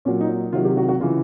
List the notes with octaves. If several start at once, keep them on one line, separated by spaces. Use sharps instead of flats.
A#2 F#3 C#4
D#4
C3 D#3 F#3 F4
G4
F#4
F#4
C#3 E3 F4